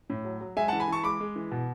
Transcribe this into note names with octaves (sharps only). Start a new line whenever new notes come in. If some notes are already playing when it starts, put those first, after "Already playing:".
A2
F#3
F#3
G#3 E5 G#5
F#5 A5
E3
G#5 B5
E3 A5 C#6
G#3 B5 D6
G#3
E3
B2